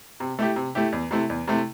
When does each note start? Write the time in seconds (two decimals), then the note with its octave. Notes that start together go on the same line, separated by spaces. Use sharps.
0.20 C3
0.39 A3 E4 G4
0.56 C3
0.75 A3 E4 G4
0.92 E2
1.11 C3 A3 E4
1.30 E2
1.47 C3 A3 E4